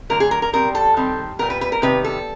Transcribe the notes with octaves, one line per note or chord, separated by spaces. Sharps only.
D3 F#3 A3 A#4
G#4
A#4
A#4
B2 G3 C4 A#4
A4
D#3 G3 C4
A#2 G3 B3 A#4
B4
B4
A#4
C3 D#3 G3 B3 B4
A4